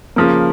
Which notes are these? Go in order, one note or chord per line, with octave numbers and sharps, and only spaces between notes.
C#3 F3 A#3